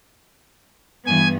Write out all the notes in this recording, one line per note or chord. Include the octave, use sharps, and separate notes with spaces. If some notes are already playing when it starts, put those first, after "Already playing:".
G2 E3 B3 G#5